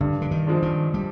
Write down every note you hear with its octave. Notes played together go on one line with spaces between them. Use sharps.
G2 D3
D3
D#3
F3 G#3 D4
D#3
G3